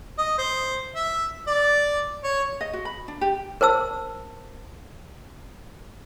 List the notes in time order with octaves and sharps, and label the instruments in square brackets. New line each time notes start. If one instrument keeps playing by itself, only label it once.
[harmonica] D#5
C5
E5
D5
C#5
[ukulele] D#5
F#4
B5
D4
G4
[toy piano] A#4 C5 A5 E6